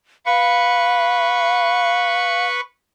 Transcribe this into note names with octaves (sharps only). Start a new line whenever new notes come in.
B4 F5 C#6